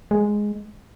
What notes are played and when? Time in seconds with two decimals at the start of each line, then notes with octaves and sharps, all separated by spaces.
0.11 G#3